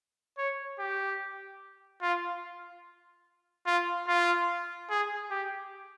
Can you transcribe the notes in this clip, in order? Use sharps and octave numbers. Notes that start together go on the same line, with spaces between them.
C#5
G4
F4
F4
F4
G#4
G4